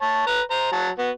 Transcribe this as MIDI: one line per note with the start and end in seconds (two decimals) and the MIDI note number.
0.01 0.25 73
0.01 0.25 81
0.27 0.41 71
0.27 0.41 82
0.51 0.69 72
0.51 0.69 82
0.72 0.89 54
0.72 0.89 81
0.99 1.10 59
0.99 1.10 66